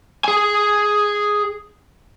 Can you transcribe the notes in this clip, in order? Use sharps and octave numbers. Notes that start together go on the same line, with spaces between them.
G#4 G#5